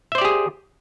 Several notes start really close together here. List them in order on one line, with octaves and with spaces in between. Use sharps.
E5 C5 D5 G4 G#4